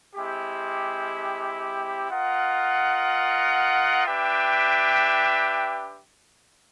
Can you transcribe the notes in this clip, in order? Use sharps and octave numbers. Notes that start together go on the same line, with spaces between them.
G#3 C4 E4 G4
F4 A#4 D#5 F#5
D4 G4 B4 E5 G5